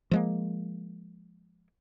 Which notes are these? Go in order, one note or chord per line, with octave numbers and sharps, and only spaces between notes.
F3 G#3 A#3